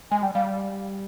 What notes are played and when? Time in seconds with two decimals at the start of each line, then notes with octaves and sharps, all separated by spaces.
0.11 G#3 G#5
0.23 G3 G5
0.35 G3 F5